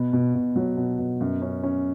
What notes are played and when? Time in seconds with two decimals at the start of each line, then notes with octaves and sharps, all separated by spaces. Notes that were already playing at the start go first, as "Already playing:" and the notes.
Already playing: B2 B3
0.13 B2
0.34 B2
0.56 F#3
0.77 B2
0.99 B2
1.20 F#2
1.42 C#4
1.63 C#4